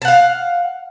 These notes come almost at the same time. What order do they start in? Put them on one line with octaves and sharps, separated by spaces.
A5 F#5 F5